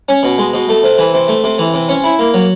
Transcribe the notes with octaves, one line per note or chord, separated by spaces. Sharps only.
C#4
B2
G#3
B2
A3
C3
E3
C3
A3
C3
E3
C3
C#4
E4
A#3
F#3